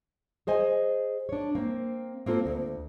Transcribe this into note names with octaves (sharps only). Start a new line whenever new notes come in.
G#4 C5 D#5 G#5
D4 C#5
A#3 C4
A#3 C4 F4 A4
D2